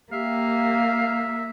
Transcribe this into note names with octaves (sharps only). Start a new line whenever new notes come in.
A#3 G4 E5 F5